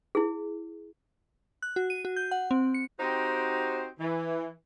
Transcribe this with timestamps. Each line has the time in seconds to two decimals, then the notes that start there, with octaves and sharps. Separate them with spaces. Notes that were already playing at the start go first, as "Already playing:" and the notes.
0.15 E4 G#4
1.62 F#6
1.76 F#4
1.90 D#7
2.05 F#4
2.16 G6
2.31 F#5
2.51 C4
2.74 C#7
2.99 C4 D#4 F#4 G4 C5
3.99 E3